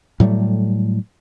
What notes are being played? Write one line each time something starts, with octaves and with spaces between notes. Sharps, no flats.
A2 F#3 G3 A3